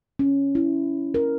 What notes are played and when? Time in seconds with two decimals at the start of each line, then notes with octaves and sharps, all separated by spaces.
0.19 C#4
0.55 E4
1.14 A#4